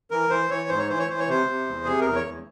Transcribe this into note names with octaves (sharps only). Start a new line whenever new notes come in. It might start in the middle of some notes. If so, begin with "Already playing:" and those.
E3 A#4
E3 C5
E3 C#5
G#2 C5
C#5
E3 C5
C#5
E3 C5
C#5
C3 C5
C3
E2
C3 G#4
E2 A#4
C#5
E2